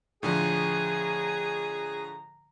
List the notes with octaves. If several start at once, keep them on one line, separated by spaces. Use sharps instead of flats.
A2 D3 F3 G#4 A#5